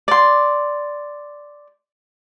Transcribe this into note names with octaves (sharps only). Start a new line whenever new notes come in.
D5 C6